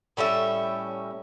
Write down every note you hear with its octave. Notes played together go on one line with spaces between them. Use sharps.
A2 G3 C#4 E5